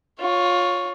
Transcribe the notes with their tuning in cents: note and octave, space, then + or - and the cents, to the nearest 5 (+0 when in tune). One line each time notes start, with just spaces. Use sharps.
F4 +20 C#5 +0